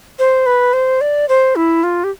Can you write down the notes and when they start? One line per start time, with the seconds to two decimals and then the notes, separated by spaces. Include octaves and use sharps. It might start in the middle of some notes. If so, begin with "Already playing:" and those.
0.19 C5
0.46 B4
0.73 C5
1.01 D5
1.29 C5
1.56 E4
1.83 F4
2.04 G4